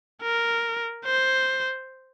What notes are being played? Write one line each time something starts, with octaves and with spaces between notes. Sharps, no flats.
A#4
C5